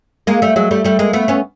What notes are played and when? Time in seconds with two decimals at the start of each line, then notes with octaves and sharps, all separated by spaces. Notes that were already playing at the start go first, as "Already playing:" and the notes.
0.27 G#3 A#3
0.42 G3 A3
0.56 F#3 G#3
0.71 G3 A3
0.84 G3 A3
0.99 G#3 A#3
1.13 A3 B3
1.28 B3 C#4